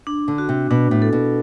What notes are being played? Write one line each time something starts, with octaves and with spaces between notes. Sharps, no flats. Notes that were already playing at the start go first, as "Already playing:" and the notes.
D4
D3
F#4
C3
B2 D4
A2
A4
B2